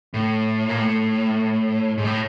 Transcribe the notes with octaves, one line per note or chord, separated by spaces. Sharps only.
A2
A#2
A2
G#2
A2